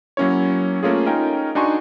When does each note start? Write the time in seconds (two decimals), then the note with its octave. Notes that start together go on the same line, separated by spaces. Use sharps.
0.17 F#3 A#3 C#4 E4 C#5
0.83 A3 A#3 C#4 F4 G#4
1.06 C#4 D#4 F4 A#4 G5
1.55 D4 D#4 F#4 G#5 C6 C#6